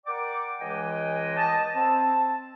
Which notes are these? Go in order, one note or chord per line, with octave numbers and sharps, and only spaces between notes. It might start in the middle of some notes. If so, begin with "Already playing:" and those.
A#4 D5 F#5 G5 D6
C#2 E3 G#3 D#5 G5 G#5
D#5 A5
C4 A5